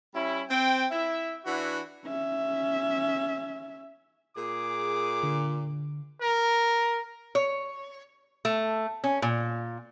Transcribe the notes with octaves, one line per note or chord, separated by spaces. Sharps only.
G3 C#4 E4
C4 G5
E4 E5
E3 D4 E4 F#4
C#4 E5
A#2 G#4 D6
D3
A#4
C#5
A3
C#4
A#2